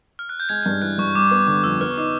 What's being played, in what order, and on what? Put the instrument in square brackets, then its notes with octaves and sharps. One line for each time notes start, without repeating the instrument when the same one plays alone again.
[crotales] F6
F#6
G6
[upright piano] G#3 [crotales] G#6
[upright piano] G2
[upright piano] E3 [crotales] F#6
[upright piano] G2 [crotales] C#6
[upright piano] G3 [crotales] D6
[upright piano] B3
[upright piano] D3 [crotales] C#6
[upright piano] F2 [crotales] E6
[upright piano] B3 [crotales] F6
[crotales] C#6
[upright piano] D#4 [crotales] D6